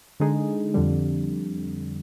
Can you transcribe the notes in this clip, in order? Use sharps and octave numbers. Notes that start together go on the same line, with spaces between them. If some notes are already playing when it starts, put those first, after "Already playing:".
D3 G#3 D#4 G#4
F2 D3 G3